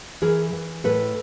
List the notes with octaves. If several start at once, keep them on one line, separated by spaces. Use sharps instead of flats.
E3 G#4 A#4
E3
A2 A4 B4